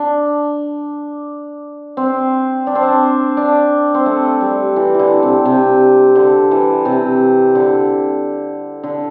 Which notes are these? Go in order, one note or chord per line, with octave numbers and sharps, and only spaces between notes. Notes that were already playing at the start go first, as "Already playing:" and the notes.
Already playing: D4
C4
D4
C4
D4
D4
C4
A3
G3
E3
E3
D3
C3
C3
D3
E3
C3
D3
D3